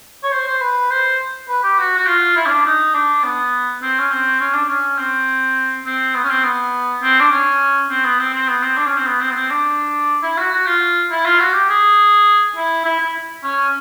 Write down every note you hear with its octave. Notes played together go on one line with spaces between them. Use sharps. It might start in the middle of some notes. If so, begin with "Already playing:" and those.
C#5
C5
C5
B4
C5
B4
G4
F#4
F#4
F4
E4
C#4
D4
D#4
D4
B3
C4
C#4
C4
C#4
D4
C#4
C4
C4
B3
C#4
C4
B3
C4
D4
C#4
C4
B3
C4
C4
B3
C4
D4
C#4
C4
B3
C4
B3
C4
D4
E4
F#4
F#4
F4
E4
F4
F#4
G4
G#4
E4
E4
E4
C#4